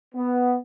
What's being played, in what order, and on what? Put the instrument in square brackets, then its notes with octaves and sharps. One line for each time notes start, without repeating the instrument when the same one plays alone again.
[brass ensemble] B3